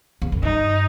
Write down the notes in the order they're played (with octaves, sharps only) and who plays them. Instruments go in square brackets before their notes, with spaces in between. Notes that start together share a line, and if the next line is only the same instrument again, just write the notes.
[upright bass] E2
F#2
[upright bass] G2 [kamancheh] D#4